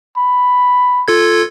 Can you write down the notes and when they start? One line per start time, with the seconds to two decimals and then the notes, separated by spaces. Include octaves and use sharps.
0.17 B5
1.08 F4 A4 G#6